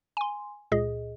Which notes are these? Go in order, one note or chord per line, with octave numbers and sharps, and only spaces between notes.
G#5 C6
C#2 A#2 G#4 D#5